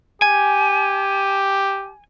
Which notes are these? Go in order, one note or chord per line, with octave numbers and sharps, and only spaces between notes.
G4 G#5